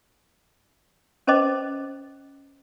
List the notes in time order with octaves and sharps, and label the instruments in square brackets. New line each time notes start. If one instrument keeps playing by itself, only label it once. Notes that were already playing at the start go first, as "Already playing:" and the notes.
[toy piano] C#4 B4 C5 D#5 D6